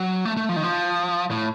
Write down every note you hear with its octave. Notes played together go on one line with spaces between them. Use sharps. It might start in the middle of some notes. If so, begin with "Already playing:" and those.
Already playing: F#3
A3
A3
F3
D#3
F3
A2